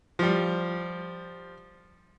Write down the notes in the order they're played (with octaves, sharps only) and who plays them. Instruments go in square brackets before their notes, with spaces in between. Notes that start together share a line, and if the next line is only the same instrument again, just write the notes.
[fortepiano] F3 G3